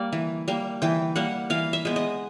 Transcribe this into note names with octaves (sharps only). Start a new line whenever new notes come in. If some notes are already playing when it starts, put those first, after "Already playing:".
Already playing: G3 A#3 D5
E3
G3 A#3
E3 G5
G3 A#3 F#5
E3 F5
E5
G#3 B3
D#5